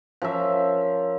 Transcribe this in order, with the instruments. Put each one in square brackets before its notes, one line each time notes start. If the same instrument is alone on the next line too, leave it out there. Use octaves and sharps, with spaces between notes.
[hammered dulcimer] F3 C#4 A#4 E5